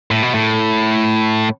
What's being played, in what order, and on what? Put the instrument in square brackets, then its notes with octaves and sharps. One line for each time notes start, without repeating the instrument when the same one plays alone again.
[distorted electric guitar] A2
B2
A2